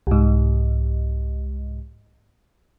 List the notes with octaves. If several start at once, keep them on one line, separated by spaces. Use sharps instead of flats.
C2 G#2